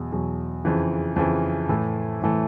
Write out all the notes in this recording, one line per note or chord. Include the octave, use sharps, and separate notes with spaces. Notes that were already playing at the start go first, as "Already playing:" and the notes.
Already playing: E2 B2 F#3
E2 B2 F#3
F2 C#3 E3
F2 C#3 E3
A2 E3 A3
A2 E3 A3